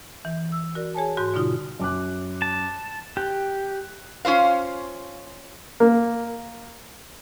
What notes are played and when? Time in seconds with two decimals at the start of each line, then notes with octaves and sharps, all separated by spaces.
0.25 E3
0.50 E3 E6
0.75 F#4 A#4 D5
0.95 G#4 C#5 G#5 A5
1.17 G#2 F#4 C6 G6
1.34 B2 D3 G3 D#4 F4 D#6
1.79 F#2 D6 F#6
2.42 A5
3.17 G4 F#6
4.25 C#4 F4 C5 F5
5.80 A#3